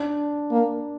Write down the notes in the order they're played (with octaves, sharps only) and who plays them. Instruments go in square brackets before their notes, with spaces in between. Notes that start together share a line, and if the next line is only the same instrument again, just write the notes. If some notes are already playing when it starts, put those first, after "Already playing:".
Already playing: [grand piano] D4
[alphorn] A#3